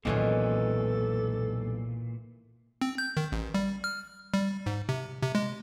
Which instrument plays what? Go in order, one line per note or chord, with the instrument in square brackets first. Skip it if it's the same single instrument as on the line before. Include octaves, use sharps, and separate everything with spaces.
[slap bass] E1 B1 G2 [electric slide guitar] A#2 [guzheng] D#3 E3 C#4 [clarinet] A4
[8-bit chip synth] C4
G6
D#3
A1
G3
F6
G3
G#2
C3
C3
G#3